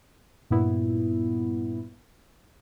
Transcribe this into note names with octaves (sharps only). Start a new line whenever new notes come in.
G2 A#2 B3 E4